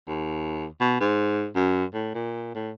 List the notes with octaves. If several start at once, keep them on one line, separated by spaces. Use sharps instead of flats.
D#2
B2
G#2
F#2
A2
A#2
A2